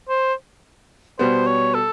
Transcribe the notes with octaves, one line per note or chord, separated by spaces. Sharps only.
C5
B2 G3 B3 C5
C#5
A4